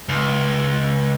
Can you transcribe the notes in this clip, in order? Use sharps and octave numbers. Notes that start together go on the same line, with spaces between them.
C#2